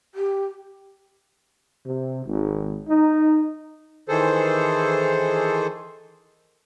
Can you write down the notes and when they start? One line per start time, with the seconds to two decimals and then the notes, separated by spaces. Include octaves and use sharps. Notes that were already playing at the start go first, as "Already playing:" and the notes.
0.15 G4
1.86 C3
2.25 G#1
2.88 D#4
4.08 D#3 E3 G#4 A4 C5